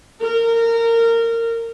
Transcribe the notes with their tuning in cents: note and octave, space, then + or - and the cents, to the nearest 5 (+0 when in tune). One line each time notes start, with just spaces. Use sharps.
A#4 -20